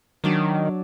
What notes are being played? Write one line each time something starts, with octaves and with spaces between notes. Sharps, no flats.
D#3 F#3 D4 D5